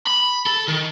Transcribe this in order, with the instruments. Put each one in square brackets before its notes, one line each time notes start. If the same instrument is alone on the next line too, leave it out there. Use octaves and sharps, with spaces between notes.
[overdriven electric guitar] B5
A4
D#3